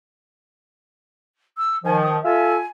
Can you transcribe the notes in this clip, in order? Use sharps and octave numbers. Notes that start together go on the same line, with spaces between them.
E6
D#3 F3 G#5
D#6
F4 A4 E5 G#5